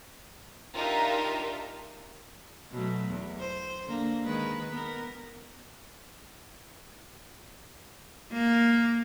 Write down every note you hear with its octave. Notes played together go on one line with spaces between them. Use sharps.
D4 D#4 F4 G4 A#4 E5
B2 F#3 A3
E2
C5
D3 A#3
D#3 G#3 B4
B3 A#4
A#3